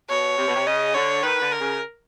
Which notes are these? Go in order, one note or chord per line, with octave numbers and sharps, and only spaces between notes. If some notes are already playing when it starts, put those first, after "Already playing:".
B2 C#5
C3
B2
C3
C#3 D#5
D3 C#5
D#3 B4
D3
A#4
C#3